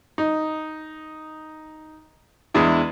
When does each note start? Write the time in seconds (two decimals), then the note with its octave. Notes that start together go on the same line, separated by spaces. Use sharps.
0.18 D#4
2.54 E2 G#3 D4 E4